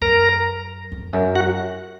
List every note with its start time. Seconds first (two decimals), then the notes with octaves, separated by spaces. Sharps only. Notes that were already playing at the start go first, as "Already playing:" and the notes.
0.01 F#2 A#4 A#5
0.92 F2
1.13 F#2
1.35 F#4 F#5